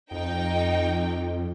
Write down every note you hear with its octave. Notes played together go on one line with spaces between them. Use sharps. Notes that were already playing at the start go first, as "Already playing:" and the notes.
F2 D#4 G5